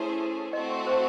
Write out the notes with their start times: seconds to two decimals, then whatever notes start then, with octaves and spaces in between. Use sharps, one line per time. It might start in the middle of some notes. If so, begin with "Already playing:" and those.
Already playing: A3 C#4 E4 G#4 C5
0.53 A3 C4 F#4 D#5
0.69 E5
0.87 C5